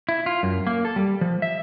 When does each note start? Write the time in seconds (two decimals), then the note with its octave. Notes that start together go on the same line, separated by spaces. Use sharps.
0.09 E4
0.26 F4
0.43 F#2
0.67 A#3
0.85 A4
0.96 G3
1.21 F3
1.42 E5